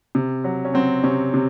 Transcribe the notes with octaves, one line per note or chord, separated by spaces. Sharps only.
C3
F#3
C#4
F#3 C4
C3 C#4
C3